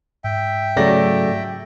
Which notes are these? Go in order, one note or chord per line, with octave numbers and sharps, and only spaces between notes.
G#2 E5 G5
C#3 F#3 A3 D5 A#6